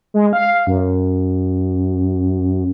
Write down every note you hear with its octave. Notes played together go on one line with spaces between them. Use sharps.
G#3
F5
F#2